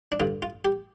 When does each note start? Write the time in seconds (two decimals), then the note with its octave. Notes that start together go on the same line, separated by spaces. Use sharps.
0.12 D4
0.20 G2 D3 F4
0.42 F4
0.65 G4